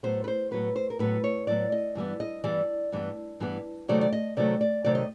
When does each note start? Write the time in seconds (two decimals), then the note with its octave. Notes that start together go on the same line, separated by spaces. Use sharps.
0.03 A2 F#3 B3 C5
0.24 B4
0.28 C5
0.51 A2 F#3 B3 B4
0.76 C5
0.90 A#4
0.99 A2 F#3 B3 B4
1.24 C#5
1.47 A2 F#3 B3 D5
1.72 D#5
1.95 G2 E3 G3 B3
2.20 D#5
2.44 G2 E3 G3 B3 D5
2.92 G2 E3 G3 B3
3.40 G2 E3 G3 B3
3.88 C3 D#3 F#3 A3 D5
4.01 D5
4.13 D#5
4.37 C3 D#3 F#3 A3 D5
4.61 D5
4.85 C3 D#3 F#3 A3 D5
4.95 D#5